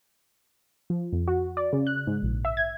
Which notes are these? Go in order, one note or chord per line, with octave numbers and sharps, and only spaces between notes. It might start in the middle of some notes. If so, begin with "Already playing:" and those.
F3
F2
F#4
D5
C#3
F#6
G#2
A#1
E5
G#6